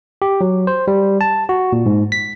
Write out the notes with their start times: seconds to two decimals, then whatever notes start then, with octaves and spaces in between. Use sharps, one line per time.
0.22 G4
0.41 F#3
0.67 C5
0.88 G3
1.21 A5
1.49 F#4
1.73 A#2
1.86 G#2
2.12 B6